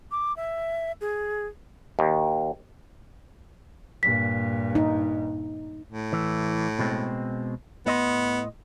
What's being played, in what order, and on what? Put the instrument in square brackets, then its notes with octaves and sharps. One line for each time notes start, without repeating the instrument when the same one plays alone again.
[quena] D6
E5
G#4
[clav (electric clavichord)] D#2
[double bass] G2 A#2 [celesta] B6
[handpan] D#4
[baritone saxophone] A2
[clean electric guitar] E3
B2 G#3 C4
[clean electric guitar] A2 D#5 C6 [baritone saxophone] B3